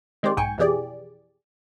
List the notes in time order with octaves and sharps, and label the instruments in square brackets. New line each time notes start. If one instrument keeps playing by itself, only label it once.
[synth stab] D#3 G#3 C4 G4 C5 D5
B1 G#2 G5 G#5 C#6
F2 B2 E3 G4 G#4 D5